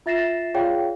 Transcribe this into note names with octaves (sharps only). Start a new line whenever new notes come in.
F4 E5 A6 A#6 C7 E7
F4 G#4 C#5 D5 F5 G5